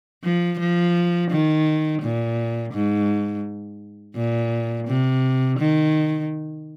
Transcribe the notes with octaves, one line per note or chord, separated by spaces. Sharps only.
F3
F3
D#3
A#2
G#2
A#2
C3
D#3